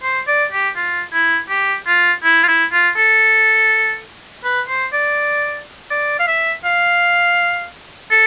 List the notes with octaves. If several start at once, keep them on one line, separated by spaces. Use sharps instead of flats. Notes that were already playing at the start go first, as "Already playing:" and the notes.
C5
D5
G4
F4
E4
G4
F4
E4
F4
E4
F4
A4
B4
C5
D5
D5
F5
E5
F5
A4